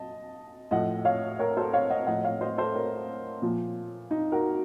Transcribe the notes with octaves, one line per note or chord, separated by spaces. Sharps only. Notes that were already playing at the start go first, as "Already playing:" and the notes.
Already playing: D#5 A5
A2 F3 D#5 F#5
C#5 F5
A#4 C#5
A4 C5
C#5 F5
D#5 F#5
A2 F3 D#5 F#5
C#5 F5
C5 D#5
A4 C5
A#4 C#5
A#2 F3
D#4
F#4 A#4